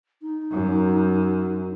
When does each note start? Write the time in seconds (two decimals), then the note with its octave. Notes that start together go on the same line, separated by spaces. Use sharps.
0.22 D#4
0.51 F#2